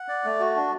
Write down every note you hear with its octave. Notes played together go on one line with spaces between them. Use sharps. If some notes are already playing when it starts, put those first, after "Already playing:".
Already playing: F#5
D5
A3
F#4
D4